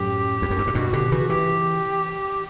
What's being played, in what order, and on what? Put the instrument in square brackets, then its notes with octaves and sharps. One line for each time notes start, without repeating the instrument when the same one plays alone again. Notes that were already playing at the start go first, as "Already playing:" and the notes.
Already playing: [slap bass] F#2 A2 [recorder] G4
[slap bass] E2
F#2
G2
A2
[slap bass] G2 B2 [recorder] F#4
[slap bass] B2 D3 [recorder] G4
[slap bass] C#3 E3 [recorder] F#4
[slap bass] E3 [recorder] G4